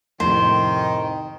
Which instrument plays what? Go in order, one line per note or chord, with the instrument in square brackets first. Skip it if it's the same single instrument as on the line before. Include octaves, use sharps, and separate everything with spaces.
[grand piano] F2 A2 C3 [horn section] D#3 [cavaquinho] C5